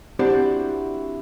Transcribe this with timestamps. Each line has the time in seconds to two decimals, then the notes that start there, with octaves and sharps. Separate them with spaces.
0.19 C4 D4 E4 F#4 G4 C5